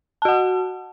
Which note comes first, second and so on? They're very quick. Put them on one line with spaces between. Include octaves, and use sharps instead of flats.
A5 F#4 F#5